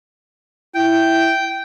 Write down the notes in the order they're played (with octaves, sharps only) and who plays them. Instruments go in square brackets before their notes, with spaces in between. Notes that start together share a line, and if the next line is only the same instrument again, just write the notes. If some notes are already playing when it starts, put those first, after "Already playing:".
[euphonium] E4 [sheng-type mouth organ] G5